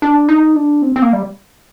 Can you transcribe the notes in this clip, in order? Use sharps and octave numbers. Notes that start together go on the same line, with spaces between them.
D4
D#4
D4
C4
C4
A#3
G3